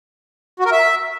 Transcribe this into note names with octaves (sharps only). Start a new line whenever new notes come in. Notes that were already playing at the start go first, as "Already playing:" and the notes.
F#4
A#4
E5